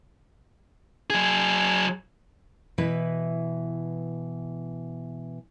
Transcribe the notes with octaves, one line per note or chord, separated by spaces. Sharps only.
F#3 G#4
B2 E3 E4 B4